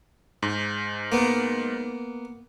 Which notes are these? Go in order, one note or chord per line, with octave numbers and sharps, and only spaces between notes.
G#2
A#3 B3